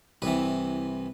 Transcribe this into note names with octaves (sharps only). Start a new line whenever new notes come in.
C2 C3 E3 B4